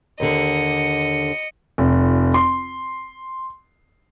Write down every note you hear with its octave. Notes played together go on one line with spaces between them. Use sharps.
D#2 D3 D#5 C#7
F1
C6